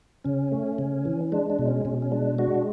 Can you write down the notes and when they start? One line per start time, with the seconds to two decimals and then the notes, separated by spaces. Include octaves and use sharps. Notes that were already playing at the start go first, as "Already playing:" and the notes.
0.24 C#3 C#4
0.52 A3
0.78 C#3
1.05 E3
1.32 G#3 D4
1.50 D4
1.59 B2
1.68 C#4
1.85 B2 C#4
2.02 C#4
2.12 G#3 D4
2.38 G#3 D4 F#4